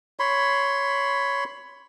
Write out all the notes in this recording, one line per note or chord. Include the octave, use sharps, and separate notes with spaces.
C#5 B5 C6